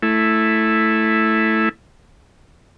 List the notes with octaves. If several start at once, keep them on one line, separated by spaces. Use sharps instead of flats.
A3 E4